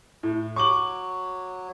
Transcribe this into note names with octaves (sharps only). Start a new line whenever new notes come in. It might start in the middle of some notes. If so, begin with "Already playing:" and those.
A2
F#3 C#6 D6 F#7